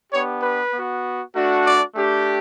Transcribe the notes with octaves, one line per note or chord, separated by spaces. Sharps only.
B3 D4 G4 C#5
B4
B3 F#4
A3 D4 F#4
D5
A3 D4 G4